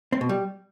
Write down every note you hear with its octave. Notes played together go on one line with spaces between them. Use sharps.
C4
B2
G3